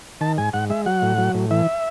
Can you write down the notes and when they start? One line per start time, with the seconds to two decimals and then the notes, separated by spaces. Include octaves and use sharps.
0.21 D#3 A5
0.38 G#2 G#5
0.53 G#2 F#5
0.70 G#3 E5
0.86 F#3 F#5
1.02 A2
1.18 F#3
1.35 A2
1.51 E3 E5